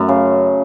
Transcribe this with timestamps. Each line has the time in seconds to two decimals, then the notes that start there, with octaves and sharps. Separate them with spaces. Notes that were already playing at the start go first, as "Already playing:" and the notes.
Already playing: F#2 A3
0.09 C#3